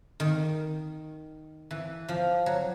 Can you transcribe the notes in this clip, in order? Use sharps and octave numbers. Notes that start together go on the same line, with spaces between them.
D#3
E3
F3
F#3